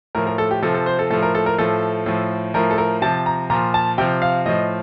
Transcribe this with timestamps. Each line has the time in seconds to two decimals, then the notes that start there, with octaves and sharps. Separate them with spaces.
0.15 A2 F3 A#4
0.27 A#4
0.38 A4
0.51 G4
0.62 C3 F3 A4
0.74 A4
0.86 C5
0.99 A4
1.10 A2 F3 A4
1.23 A#4
1.35 A4
1.46 A#4
1.58 A2 F3 A4
2.06 A2 F3
2.54 A2 F3 A#4
2.71 A4
2.78 A#4
3.02 C3 F3 A5
3.26 A#5
3.50 A#2 F3 A#5
3.74 A5
3.98 C3 F3 G5
4.22 F5
4.46 A2 F3 D#5